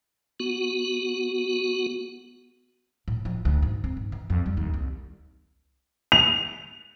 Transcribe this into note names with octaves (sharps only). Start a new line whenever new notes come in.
B3 F#4
A2
F3
D2
G#2
C4
G#2
E3
F2
G3
D#2
C2
F7